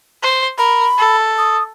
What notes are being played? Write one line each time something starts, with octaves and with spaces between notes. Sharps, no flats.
C5
A#4 B5
A4
D#6